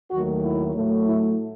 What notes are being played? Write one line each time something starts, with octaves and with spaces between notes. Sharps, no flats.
D#2 D#3 F#3 A3 F#4
E4
A2 F#3 A3
E4